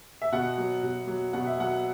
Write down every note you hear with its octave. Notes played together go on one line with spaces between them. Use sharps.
E5
B2 F#5
F#3
B2
F#3
B2 F#5
E5
F#3 F#5